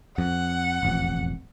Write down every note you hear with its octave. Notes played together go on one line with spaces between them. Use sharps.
F2 F#5
E1 A1 F2